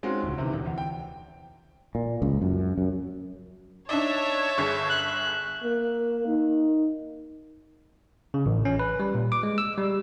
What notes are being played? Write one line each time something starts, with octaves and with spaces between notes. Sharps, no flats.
G#3 C4 C#4 D#4 F4 F#4
D1 C#2
C3 D#3 E3
D2
E2
G5
A#2
C#2
F#2
F#2
D4 D#4 C#5 D5 E5 A5
G1 G#4 C#6
F#6
A#3
D#4
C#3
A1
C#4
B4
G3
A#2
D6
G#3
E6
G3